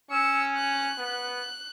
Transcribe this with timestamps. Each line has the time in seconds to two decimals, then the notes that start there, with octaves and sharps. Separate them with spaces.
0.11 C#4 E6 C#7
0.57 F#6
0.98 B3